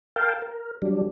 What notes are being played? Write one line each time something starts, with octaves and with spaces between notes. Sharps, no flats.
A#4 F5 G5 A5
A#4
F#3 G3 D4